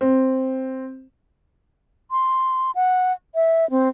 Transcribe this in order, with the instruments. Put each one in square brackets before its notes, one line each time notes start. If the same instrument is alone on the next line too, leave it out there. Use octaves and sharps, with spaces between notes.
[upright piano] C4
[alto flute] C6
F#5
E5
C4